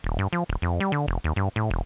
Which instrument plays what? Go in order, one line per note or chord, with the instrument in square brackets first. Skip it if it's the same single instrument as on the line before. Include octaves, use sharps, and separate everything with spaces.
[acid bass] D#1
G2
F3
D1
F2
G3
D3
F1
D#2
G2
A2
E1